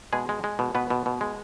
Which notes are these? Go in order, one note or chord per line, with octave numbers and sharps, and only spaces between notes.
B2 G#3 G#4
G#3
G#3
B2
B2 B3 B4
B2
B2
G#3